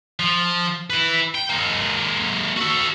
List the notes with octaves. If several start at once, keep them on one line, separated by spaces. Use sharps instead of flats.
F3
E4 B4
G5
G#3 A#3
F#4 A4